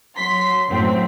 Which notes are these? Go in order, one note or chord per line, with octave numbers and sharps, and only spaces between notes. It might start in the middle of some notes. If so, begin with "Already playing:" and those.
F#3 C6 B6
F#2 A2 F#3 C4